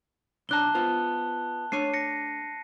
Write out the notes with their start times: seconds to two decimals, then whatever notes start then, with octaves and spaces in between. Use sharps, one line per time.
0.49 B1 D4 A5 A#5 F#6 G7
0.75 B3 F4 C5
1.72 A3 D4 C#5 C7 D#7
1.94 A#6 C#7